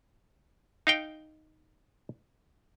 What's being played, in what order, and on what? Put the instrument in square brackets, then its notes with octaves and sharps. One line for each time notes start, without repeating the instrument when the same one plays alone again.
[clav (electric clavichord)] D#4 F5 G5